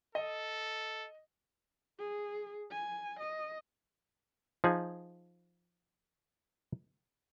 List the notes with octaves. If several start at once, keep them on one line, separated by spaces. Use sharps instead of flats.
A4 D#5
G#4
G#5
D#5
F3 D#4 G#4